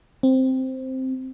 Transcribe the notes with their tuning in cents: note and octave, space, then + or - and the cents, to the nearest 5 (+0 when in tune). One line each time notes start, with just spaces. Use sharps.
C4 +0